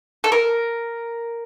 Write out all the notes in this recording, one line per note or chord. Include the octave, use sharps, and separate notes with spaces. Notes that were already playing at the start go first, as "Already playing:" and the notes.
A4
A#4